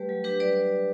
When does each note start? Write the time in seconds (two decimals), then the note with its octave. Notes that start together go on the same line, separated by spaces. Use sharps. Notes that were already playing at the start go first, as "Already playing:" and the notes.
Already playing: G3 A3 G4 B4
0.09 F#3
0.24 D4 G4 B4
0.40 G3 B4 D5